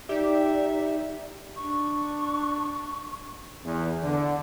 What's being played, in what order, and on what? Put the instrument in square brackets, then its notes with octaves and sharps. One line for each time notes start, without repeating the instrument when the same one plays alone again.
[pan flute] D#4 [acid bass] G4 [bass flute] D5 [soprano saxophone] E5
[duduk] D4 [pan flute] C#6
[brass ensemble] E2
D3